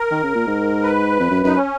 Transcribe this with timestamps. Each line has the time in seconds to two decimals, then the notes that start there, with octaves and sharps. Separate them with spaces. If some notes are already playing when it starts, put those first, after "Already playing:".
Already playing: A#4
0.11 D#3
0.23 C#3
0.35 A#2
0.47 G#2
0.83 B4
1.20 F2
1.31 F#2
1.44 F#2 D#4
1.55 C#4